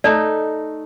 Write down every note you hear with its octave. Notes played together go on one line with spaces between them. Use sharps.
A3 D#4 D5